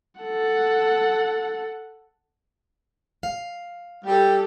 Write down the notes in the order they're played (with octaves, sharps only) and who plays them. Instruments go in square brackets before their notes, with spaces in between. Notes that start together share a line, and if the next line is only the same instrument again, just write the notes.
[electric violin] A4 F#5
[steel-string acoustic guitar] F5
[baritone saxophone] G3 [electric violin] G4 A4